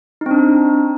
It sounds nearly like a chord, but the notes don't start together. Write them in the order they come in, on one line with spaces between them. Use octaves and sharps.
D#4 C4 D4